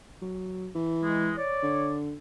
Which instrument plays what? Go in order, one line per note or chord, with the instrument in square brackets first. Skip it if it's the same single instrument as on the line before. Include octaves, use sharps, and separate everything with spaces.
[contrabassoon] F#3
E3
[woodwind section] G#3
C#5 D5
[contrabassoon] D3